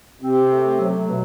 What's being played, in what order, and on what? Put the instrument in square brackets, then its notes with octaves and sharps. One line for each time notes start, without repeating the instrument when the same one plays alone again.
[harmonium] C3 [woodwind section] C4
[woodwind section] A3
F#3
B2